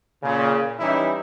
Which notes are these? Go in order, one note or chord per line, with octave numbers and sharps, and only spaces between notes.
A#2 C#3
E3 G3 C#4 D#4 E4